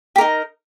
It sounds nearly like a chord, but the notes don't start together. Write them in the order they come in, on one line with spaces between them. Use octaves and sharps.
G4 A#4 D#4